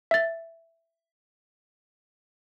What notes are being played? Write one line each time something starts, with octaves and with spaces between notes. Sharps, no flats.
E5 A6